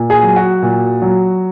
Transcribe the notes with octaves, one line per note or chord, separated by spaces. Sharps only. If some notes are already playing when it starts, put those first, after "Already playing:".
Already playing: A#2
G#4
F#3
F#4
A#2
F#3